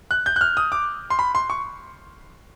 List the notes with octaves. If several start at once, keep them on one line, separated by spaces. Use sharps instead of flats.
F#6
G6
F#6
F6
D#6
D6
C6
B5
C6
C#6